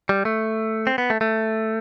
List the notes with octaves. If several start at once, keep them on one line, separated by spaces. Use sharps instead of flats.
G3
A3
C4
B3
A3
A3